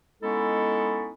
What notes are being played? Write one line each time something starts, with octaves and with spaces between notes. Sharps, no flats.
G#3 B3 C#4 D#4 E4 A4